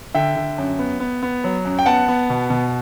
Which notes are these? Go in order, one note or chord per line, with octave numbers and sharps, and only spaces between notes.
D3 E5 G5
D3
F#2
B3
B3
B3
F#3
F#2
G5
B3 F#5 A5
B3
B2
B2